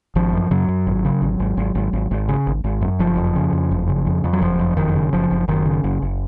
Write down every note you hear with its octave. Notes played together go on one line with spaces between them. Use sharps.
G#1 F3
F#2
F#2 C#3 F#3
F#2
G#1
C#3
G#1
G#1
G#1
G#1
G#1
G#1
C#3
G#1
G#1
F#2
F#1 F3
F2
C#3
F2
F#1
C#3
F2
F2
F#3
F#1 F3
F2
F#1 D#3
C#3
F#1 F3
F#1
F#1 D#3
C#3
F#1
F#1